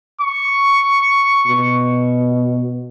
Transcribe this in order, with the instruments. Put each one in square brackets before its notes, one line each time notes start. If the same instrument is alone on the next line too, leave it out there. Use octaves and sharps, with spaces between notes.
[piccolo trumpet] C#6
[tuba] B2